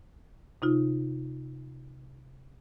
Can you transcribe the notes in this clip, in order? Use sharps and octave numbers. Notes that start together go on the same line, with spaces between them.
C3 D#4 F4